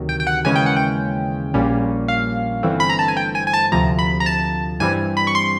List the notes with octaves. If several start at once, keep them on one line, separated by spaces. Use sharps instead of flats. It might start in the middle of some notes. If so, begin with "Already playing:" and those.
Already playing: D2 C3 D#3 F#3
G5
G5
F#5
D#2 C#3 E3 G#3 C#4 G#5
G5
F#5
G5
A#1 A#2 G3 A#3 C#4
F5
G1 G2 E3 A3 C4
B5
A#5
A5
G#5
G5
G#5
G#5
A5
D2 C3 F3 A#5
B5
A#5
A5
G2 E3 G3 C4 G#5
B5
C#6
C6